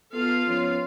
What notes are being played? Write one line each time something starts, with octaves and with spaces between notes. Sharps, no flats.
B3 F4 A4 F5
F3 B3 C#4